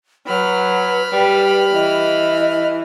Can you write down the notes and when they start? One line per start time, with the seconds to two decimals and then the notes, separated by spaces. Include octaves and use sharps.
0.27 F#3 B4 B5 F6
1.12 G3
1.73 E3 D#5